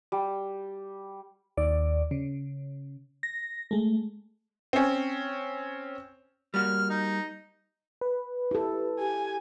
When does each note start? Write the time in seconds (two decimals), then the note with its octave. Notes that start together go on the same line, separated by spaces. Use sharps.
0.12 G3
1.57 D#2 D5
2.11 C#3
3.23 A#6
3.71 G#3 A3
4.73 C4 C#4
6.54 G3 A#3 F#4 F6
6.90 D#4
8.01 B4
8.51 E4 G4 A4
9.00 G4 G#5